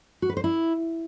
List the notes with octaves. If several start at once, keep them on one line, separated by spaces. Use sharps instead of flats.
F#4
B4
C5
E4